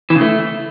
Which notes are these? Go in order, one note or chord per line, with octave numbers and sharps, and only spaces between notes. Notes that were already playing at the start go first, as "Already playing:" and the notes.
E3
C#3
A3